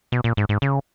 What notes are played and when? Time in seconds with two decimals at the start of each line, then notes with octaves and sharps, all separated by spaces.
0.12 B2
0.24 A#2
0.37 G#2
0.49 G#2
0.62 C#3